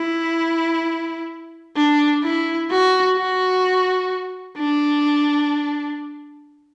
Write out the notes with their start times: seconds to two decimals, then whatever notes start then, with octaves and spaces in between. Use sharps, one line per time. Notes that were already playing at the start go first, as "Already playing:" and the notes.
Already playing: E4
1.77 D4
2.24 E4
2.71 F#4
3.17 F#4
4.58 D4